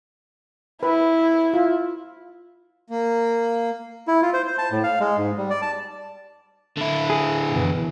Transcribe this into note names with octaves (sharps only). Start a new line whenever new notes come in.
E4 B4
F4
A#3
E4
F4
C5
C5
A5
A2
F5
G#3
G#2
G3
D5
A5
D3 E4
G#4
F#2 B2 E3